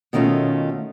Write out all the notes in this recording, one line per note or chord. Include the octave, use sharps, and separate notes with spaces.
B2 D#3 A3 C#4 F4